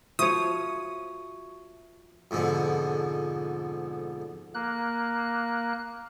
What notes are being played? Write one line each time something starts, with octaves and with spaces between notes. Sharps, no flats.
F3 F#4 C#5 E5 C#6 D#6
F2 G#2 B2 D3
A#3 F#6